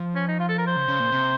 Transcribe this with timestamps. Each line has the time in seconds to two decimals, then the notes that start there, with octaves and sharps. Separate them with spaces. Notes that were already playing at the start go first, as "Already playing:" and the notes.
Already playing: F3
0.16 C#4
0.28 D#4
0.40 F4
0.49 A4
0.58 A#4
0.67 C5
0.76 C#3
0.88 C#3
0.99 A#2
1.12 C3